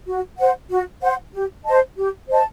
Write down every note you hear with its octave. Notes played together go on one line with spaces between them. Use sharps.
F#4
C5 F#5
F#4
C5 F#5
G4
C5 D#5 A5
G4
C5 D#5 A5